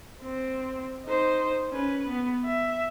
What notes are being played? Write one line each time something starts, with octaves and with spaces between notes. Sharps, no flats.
C4
D#4 C5
C#4 B4
B3
E5